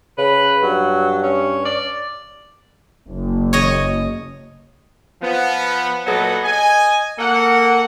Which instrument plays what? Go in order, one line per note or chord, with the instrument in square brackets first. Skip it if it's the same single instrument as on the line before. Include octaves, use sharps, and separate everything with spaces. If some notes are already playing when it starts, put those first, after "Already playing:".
[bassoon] C#3 [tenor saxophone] B4
[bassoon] G2 [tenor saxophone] F#3
[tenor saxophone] C#4
D5
[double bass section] F#1
[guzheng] C#5 D#5
[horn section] F3 B3
A#2 F#3 B3 A4 B4 D#5
D#5 G#5
A#3 A4 A#4 F#5